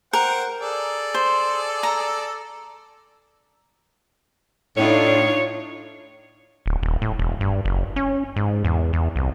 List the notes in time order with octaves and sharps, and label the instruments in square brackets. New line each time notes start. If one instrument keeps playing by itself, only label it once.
[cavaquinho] A#4 [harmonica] C5 F#5 G5
[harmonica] G#4 A4 D5
[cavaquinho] C5
A#5
[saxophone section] A2 [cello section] D4 D#4 F4 [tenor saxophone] C#5
[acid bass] D1
D#1
A2
E1
G2
F#1
C#4
G#2
E2
E2
C2